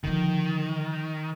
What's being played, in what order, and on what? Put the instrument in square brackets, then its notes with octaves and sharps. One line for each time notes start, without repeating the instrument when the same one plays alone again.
[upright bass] D3 F3 [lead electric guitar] D#3